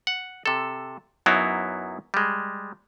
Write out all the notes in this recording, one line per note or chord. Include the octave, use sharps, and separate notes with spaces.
F#5
C3 A4
F#2 F#3 B3 D#4 E4 F5
G3 G#3